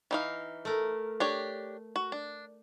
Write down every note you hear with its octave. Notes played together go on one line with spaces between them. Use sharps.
E3 D#4 F5
A3 A#4
D4 G4 C#5
F#4
D4